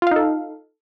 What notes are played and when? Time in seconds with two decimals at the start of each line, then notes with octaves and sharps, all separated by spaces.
0.02 F4
0.07 F5
0.11 D#4
0.16 A4